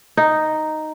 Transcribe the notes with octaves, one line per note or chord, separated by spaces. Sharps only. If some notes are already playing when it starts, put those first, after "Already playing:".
D#4